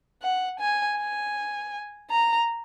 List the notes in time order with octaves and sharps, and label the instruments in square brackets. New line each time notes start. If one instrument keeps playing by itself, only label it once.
[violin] F#5
G#5
G#5
A#5